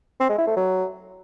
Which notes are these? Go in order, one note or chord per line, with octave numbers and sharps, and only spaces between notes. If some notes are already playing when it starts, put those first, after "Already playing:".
C4
G#3
E4
A3
F#3